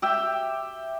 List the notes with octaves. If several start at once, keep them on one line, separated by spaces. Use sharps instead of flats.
G4 E5 G5